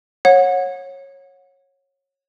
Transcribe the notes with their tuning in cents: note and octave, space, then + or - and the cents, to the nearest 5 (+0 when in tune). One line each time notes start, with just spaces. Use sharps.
C#5 -20 F#5 -25